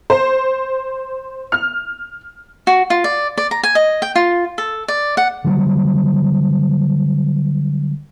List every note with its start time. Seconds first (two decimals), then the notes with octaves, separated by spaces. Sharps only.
0.10 C5
1.52 F6
2.67 F#4
2.90 F4
3.04 D5
3.38 D5
3.51 A#5
3.63 G#5
3.75 D#5
4.02 G5
4.16 F4
4.58 A4
4.88 D5
5.17 F#5
5.44 D3 F#3 G3